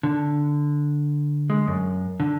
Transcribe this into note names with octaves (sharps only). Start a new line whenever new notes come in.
D3
G#3
F#2
D3